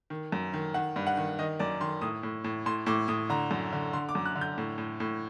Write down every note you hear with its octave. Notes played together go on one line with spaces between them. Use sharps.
D#3
F#2
D#3
D#3 F#5
G2
F#5
D#3
D#3 D#5
F#2 D5
D#3 C6
A2 D#6
A2
A2
A2 C6
A2 D6
A2 D#6
D3 A#5
F#2
D3
D3 C6
D6
F#2
F#6
D3
G6
A2
A2
A2